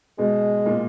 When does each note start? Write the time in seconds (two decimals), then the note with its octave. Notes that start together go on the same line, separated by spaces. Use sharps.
0.18 G#2 B2 G#3
0.66 A#2